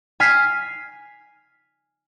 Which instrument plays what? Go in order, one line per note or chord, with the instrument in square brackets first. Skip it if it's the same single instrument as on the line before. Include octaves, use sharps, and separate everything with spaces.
[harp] G#5 F6 B6 C7